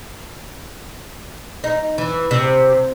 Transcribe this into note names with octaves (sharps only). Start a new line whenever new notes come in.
D#4
E3
C3